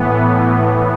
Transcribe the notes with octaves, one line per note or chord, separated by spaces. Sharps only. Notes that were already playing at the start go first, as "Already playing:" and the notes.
Already playing: A2 E3 B3